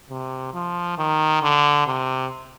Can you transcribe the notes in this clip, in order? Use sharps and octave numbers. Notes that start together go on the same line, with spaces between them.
C3
F3
D#3
D3
C3